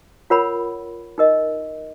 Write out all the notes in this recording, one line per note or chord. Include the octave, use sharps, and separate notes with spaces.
F4 A#4 C#5 F#5 B5
D#4 A#4 D#5